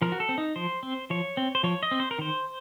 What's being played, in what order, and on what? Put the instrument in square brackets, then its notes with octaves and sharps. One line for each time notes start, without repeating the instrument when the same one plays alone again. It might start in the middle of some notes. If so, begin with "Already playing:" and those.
[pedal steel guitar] F3 A#4
F#4
A4
C4
D#4
F3 C5
C4
F3 C#5
C4
C5
F3 C#5
D#5
C4
C5
A#4
D#3 C5